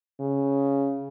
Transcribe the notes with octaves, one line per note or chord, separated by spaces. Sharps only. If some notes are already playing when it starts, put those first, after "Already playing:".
C#3